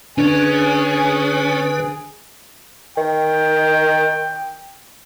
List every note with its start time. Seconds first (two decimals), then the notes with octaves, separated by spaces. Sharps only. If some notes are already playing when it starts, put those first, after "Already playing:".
0.18 D3 C#4 D4 G#4 B4
2.97 D#3 G5